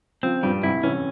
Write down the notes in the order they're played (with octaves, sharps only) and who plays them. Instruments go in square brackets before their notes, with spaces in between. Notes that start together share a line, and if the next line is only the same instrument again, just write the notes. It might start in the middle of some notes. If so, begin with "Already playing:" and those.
[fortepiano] C#3 F3 [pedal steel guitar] C4
[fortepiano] G2 A#2 [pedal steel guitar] G3
[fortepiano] G#2 C3 [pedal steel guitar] E4
[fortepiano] C3 E3 [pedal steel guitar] C#4